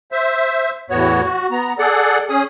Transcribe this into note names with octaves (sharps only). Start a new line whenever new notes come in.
C5 E5
E2 A2 B3 F#4 C#5
F#4
B3 A#5
G#4 A4 D5 F#5
C#4 G#4 D#6